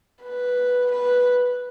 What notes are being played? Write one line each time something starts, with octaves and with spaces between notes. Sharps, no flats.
B4
B4